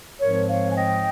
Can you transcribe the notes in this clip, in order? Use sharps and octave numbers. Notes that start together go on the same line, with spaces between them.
G#2 F3 G#3 C4 A#4 C#5
C#5 F5
G#5
D#5 G5